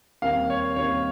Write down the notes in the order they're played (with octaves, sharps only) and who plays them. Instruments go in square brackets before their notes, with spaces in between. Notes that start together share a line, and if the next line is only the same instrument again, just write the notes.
[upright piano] D#2 D#3 G3 C4 [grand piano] F5
[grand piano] C#5
[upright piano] D#2 D#3 G3 C4 [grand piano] C#5